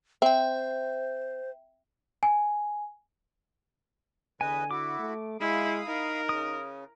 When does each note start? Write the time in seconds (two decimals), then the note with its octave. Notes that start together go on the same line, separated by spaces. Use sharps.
0.22 C4 C5 E5 G5
2.23 G#5
4.41 E2 D3 B4 D#5 G#5
4.71 E4 F#4 D6
4.99 A3
5.40 G#3 E4 F5 B5 D#6
5.87 D#4 A#4
6.29 C#3 D#6